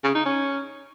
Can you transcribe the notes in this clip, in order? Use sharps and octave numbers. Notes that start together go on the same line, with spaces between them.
C#3
D#4
C#4